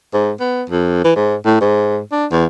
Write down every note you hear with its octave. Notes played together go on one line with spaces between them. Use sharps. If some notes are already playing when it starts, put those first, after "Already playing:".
G#2
B3
F2
E3
G#2
A2
G#2
D4
E2